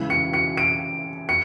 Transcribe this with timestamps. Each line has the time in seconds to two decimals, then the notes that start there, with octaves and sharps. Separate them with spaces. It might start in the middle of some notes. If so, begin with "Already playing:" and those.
Already playing: C#3 E3 G#3
0.10 C#7
0.34 C#7
0.57 D7
1.29 C#7